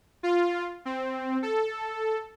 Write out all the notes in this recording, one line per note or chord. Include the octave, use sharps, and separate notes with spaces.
F4
C4
A4